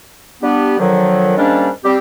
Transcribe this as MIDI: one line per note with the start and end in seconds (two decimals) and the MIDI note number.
0.43 0.78 55
0.43 0.78 59
0.43 0.78 62
0.43 0.78 67
0.79 1.34 46
0.79 1.34 50
0.79 1.34 51
0.79 1.34 53
0.79 1.34 54
1.37 1.69 44
1.37 1.69 51
1.37 1.69 55
1.37 1.69 58
1.37 1.69 61
1.37 1.69 62
1.85 1.98 55
1.85 1.98 60
1.85 1.98 67